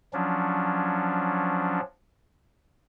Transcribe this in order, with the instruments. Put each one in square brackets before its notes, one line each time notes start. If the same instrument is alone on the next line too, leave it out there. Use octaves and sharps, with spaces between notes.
[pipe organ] F3 F#3 C#4 D4